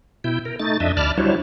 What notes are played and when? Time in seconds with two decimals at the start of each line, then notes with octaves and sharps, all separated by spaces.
0.24 B2 E4 G5
0.45 A#4
0.60 A3 D#4 A6
0.80 F2 D4 D#5 E5
0.97 D2 D5 A5 B5 F6
1.18 F#3 G3 D4 E4 C5 C#5